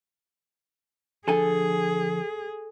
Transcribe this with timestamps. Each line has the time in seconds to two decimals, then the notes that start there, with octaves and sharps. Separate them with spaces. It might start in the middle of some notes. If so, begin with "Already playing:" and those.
1.28 D3 F3 G#4 A4 G#5